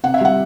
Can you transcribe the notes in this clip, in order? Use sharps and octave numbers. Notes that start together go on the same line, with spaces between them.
C3 F#5
E5
G3 F#5